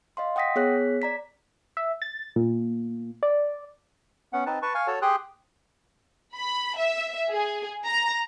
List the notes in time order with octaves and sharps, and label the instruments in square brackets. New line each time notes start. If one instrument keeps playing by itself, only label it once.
[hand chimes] D#5 F5 C6
F#5 G5 D#6 A#6 B6
B3 G#4 C#5 F#6 B6
D5 A#5 B6
[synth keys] E5
A6
A#2
D5
[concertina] B3 C#4 F#5
C4 D#4 B4 A5
B4 A5 C#6
F5 G#5 C#6
F#4 A4 C#5 A5
G4 G#4 G5 C6 D#6 F#6
[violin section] B5
E5
G#4
A#5